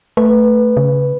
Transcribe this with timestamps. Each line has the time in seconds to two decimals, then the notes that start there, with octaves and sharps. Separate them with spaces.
0.17 A3 B4
0.77 C#3